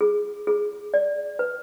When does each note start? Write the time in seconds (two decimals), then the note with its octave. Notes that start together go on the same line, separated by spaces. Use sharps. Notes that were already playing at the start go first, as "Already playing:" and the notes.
0.01 G#4
0.47 G#4
0.94 D5
1.39 B4